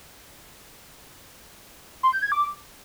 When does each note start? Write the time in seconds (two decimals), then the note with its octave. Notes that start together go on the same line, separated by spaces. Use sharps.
2.03 C6
2.13 G6
2.22 G#6
2.32 D6